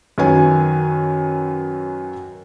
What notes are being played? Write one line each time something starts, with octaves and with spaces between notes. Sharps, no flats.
F#2 D#3 F#3 B4 C#5 G#5